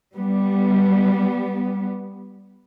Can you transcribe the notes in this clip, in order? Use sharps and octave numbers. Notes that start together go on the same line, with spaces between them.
G3 B3